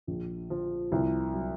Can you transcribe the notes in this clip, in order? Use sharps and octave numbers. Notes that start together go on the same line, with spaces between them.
A#1
F3
C2
F#3